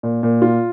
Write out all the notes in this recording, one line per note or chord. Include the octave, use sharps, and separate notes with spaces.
A#2
A#2
F4